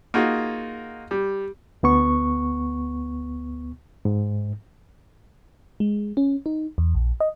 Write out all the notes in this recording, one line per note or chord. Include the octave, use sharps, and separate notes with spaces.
A#3 D#4 F4 F#4 G#4
G3
D2 B3 C#6
G#2
G#3
C#4
D#4
E2
A#1
D#5